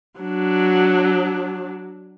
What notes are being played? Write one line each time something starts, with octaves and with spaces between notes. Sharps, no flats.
F#3 D4